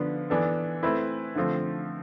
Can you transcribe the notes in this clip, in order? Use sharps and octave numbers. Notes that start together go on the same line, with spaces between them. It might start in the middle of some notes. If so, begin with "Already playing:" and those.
Already playing: D3 F3 B3 D4
E3 B3 D4 A4
A3 C4 E4 B4
D3 F3 A3 C4